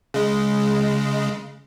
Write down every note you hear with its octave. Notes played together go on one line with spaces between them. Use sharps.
C#3 G#3